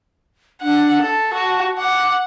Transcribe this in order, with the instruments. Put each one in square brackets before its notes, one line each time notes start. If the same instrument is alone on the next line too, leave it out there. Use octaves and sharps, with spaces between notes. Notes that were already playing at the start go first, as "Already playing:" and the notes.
[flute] D4 [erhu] F#5
[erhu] A4 [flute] A5
[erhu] F#4
[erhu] F#5 [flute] D6